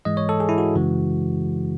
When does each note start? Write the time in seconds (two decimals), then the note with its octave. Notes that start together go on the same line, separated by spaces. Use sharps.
0.05 G#2 E3 G#3 D#5
0.17 C#5
0.29 A4
0.40 G#4
0.49 E4
0.58 F#4
0.75 F#2 C#3 E3 G#3